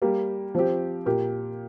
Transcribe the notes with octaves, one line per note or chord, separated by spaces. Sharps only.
G3 A#3 G4
F3 C4 G4
A#2 A#3 G4